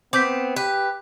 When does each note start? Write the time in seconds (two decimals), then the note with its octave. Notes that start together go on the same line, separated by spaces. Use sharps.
0.13 B3 C4 D6 G6 B6
0.56 G4 B4